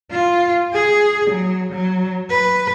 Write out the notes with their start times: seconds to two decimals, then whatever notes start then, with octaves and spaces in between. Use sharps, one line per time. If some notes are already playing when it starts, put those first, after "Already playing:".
0.11 F4
0.73 G#4
1.30 F#3
1.73 F#3
2.30 B4